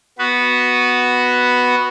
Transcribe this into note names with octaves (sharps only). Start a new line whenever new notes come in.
B3 F#4 B4